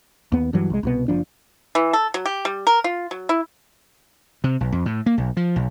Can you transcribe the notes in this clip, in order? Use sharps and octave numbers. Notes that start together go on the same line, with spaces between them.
D#2 B3
G2 E3 F#3
C2 G#3
C2 B2 B3
F#1 F3 D4
E3
A4
F#3
G4
G3
A#4
F4
F#3
E4
C3
B1
F2
A2
A#3
B1
F3
B1